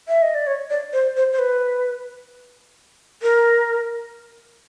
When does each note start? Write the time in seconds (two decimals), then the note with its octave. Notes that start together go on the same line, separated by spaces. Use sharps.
0.08 E5
0.22 D#5
0.34 D5
0.47 C#5
0.70 D5
0.93 C5
1.17 C5
1.32 C5
1.39 B4
3.23 A#4